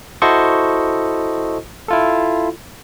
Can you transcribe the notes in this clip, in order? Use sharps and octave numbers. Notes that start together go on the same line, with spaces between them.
E4 F#4 A4 C5 D#5 C#6
E4 F4 A4